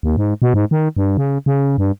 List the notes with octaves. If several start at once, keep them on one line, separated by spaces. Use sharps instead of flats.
D#2
G#2
B2
G#2
D#3
G2
C#3
C#3
G2